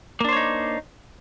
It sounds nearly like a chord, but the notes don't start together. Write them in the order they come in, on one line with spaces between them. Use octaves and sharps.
A#3 D4 C5 C#5 D#4